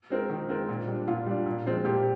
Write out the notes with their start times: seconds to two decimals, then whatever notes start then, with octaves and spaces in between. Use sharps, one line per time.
0.10 G#3 C4 F4 A#4
0.30 D#3
0.49 G#3 C4 F4 A#4
0.69 A#2
0.88 G3 D4
1.08 A#2 F4
1.27 G3 D4
1.46 A#2
1.66 F3 G#3 C4 F4
1.85 A#2 G4